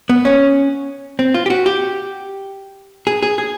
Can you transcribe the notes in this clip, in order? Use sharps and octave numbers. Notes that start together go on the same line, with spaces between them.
B3
C#4
C4
F4
G4
F#4
G4
G#4
G#4
G#4